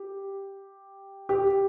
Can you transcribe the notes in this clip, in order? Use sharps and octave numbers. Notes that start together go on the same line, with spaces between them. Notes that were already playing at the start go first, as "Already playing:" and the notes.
Already playing: G4
G4